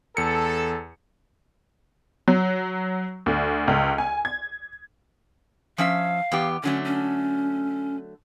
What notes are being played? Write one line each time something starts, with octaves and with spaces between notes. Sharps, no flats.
E2 A4 C#7
F#3
D2
C#2
G#5
G#6
F3 C#4 E5 F5
E2 B3 G4
D3 F#3 A3 C#4
C#4